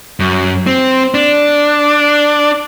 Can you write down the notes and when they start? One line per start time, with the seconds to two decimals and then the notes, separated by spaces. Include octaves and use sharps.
0.20 F#2
0.67 C4
1.14 D4